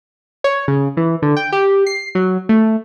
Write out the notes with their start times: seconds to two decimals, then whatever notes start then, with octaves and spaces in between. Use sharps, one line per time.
0.44 C#5
0.68 C#3
0.97 E3
1.22 D3
1.37 G5
1.52 G4
1.87 C7
2.15 F#3
2.49 A3